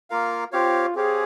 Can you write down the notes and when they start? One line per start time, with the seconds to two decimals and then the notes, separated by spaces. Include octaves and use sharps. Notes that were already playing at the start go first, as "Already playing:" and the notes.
0.10 A#3 F4 A#4 F5
0.52 C4 F4 G4 C#5 F5
0.95 C4 G4 G#4 C#5 F5